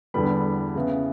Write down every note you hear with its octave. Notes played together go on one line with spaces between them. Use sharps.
E2 D3 G3 B3 B5
C#3 E3 B3